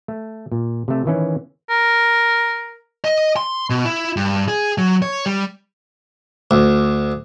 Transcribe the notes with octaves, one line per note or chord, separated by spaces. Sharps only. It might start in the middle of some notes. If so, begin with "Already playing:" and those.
A3
A#2
C3 A3
D#3 E3 C#4
A#4
D#5
C6
B2
E4
G2
G#4
F#3
C#5
G3
D2